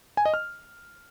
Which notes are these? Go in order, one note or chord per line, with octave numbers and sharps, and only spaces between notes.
G#5
D#5
F6